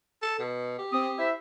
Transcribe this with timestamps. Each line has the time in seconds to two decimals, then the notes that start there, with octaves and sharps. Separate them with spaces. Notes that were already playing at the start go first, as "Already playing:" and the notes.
0.22 A4
0.39 B2
0.79 G4
0.93 C4 D#6
1.18 E4 C5 E5